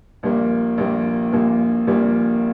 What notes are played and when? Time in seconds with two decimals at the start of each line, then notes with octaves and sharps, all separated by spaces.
0.23 A#1 A#2 G3 A#3
0.78 A#1 A#2 G3 A#3
1.32 A#1 A#2 G3 A#3
1.87 A#1 A#2 G3 A#3